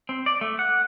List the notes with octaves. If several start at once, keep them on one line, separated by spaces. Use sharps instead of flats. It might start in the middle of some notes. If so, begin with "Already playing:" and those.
C4
D5
A3
F#5